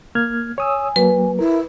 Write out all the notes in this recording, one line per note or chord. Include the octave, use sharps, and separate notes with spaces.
A#3 F6 G#6
C#5 G#5 D#6 E6
F#3 A#3 B4
E4 A#4